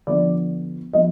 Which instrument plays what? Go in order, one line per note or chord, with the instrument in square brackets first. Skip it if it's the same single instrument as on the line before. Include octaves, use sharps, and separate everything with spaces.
[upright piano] D3 F3 B3 D5
F3 B3 D#5